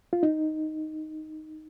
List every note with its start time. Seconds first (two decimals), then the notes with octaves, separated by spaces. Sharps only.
0.13 F4
0.23 D#4